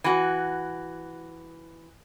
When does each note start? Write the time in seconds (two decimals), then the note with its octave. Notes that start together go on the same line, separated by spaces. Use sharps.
0.04 E3 F#4